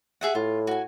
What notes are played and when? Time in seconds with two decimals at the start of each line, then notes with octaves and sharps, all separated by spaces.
0.21 G#4 E5 F#5
0.35 A2 F4
0.67 F#4 G#5